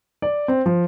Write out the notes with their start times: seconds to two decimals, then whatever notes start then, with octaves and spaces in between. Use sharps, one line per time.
0.22 D5
0.48 C4
0.66 F3